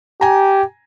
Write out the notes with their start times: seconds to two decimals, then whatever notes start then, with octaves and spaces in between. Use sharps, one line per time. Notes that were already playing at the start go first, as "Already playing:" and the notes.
0.21 G4 G#5 A#5